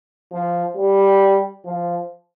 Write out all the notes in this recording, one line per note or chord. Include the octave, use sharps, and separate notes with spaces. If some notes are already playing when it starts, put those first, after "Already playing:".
F3
G3
F3